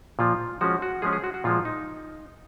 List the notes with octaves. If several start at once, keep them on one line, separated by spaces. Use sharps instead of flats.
A#2 F3 A#3 F4
F3 G#3 C#4 F#4
F#4
F3 G#3 C#4 G#4
G#4
F#4
F#4
A#2 F3 G#3 F4
D#4